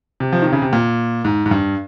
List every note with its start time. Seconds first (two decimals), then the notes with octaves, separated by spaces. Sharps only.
0.20 C3
0.33 F3
0.42 D#3
0.52 C#3
0.62 C3
0.73 A#2
1.25 G#2
1.46 G#2
1.51 G2